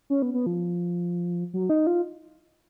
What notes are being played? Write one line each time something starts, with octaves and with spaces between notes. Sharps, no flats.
C#4
B3
B3
F3
F#3
D#4
F4